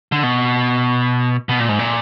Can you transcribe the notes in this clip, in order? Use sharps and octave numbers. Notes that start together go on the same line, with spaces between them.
D3
B2
B2
A#2
G#2
A#2